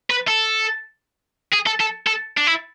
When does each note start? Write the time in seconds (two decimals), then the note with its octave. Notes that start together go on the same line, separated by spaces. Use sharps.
0.10 B4
0.27 A4
1.53 G#4
1.66 A4
1.80 A4
2.07 A4
2.37 D4
2.47 E4